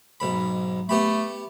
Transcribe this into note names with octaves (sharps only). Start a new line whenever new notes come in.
B1 G#2 B5
A3 B3 G4 B5